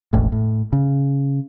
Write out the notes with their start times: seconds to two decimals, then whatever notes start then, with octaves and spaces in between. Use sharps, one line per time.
0.13 E1 A1 A2
0.32 A2
0.73 C#3